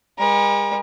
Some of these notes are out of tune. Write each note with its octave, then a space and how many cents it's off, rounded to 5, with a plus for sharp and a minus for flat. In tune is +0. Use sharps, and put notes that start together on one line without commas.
G#3 -40 A#4 +45